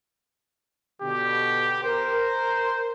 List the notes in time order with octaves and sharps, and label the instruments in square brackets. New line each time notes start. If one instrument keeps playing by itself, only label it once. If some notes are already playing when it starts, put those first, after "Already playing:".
[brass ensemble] B2 D3 [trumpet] G4
[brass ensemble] A#4 [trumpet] C5